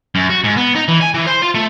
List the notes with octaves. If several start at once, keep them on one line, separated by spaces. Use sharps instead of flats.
F#2
F#4
G#2
B3
D#4
E3
G#5
E3
C5
F4
A3